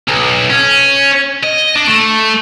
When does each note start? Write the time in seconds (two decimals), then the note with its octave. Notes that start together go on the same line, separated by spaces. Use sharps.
0.08 B1
0.50 C#4
1.43 D#5
1.75 D4
1.87 A3